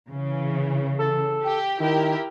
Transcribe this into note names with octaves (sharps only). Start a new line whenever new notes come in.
C#3 E3
A4
G4
D#3 E4 G4 A#4